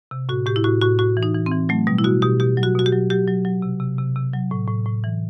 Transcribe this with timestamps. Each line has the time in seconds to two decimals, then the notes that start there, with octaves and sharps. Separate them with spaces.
0.11 C3
0.29 A2 F#4
0.46 A2 G4
0.56 E4
0.64 A2 F#4
0.81 A2 F#4
0.99 A2 F#4
1.17 E3
1.23 D#4
1.34 E3
1.46 C4
1.51 E3
1.69 F#3 A3
1.87 B2 G3
1.98 E4
2.04 B2 F#4
2.22 B2 G4
2.40 B2 G4
2.57 F#3
2.63 F#4
2.75 B2 F#4
2.86 G4
2.93 F#3
3.10 F#3 G4
3.27 F#3
3.45 F#3
3.62 C3
3.80 C3
3.99 C3
4.16 C3
4.34 F#3
4.51 A2
4.68 A2
4.86 A2
5.04 E3